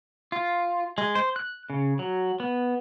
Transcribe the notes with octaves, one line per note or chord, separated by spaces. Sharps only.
F4
G#3
C5
F#6
C#3
F#3
B3